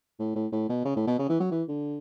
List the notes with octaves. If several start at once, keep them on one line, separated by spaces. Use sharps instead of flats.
A2
A2
A2
B2
C#3
A2
B2
C#3
E3
F#3
E3
D3